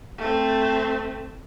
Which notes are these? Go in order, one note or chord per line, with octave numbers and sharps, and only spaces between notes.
A3 C4